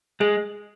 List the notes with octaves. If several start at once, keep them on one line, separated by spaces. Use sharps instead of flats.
G#3 G#4